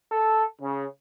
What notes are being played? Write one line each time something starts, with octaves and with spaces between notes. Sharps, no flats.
A4
C#3